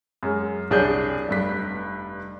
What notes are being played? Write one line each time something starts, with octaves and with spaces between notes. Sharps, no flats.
F#2 G#3
C2 D4 G#4 C#5 G6
F1 G2 B6